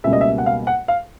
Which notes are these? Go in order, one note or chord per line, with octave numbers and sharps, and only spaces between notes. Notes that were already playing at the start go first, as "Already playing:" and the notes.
C#2 B2 G3 A#3 E5
D#5
E5
F#5
F5
F#5
F5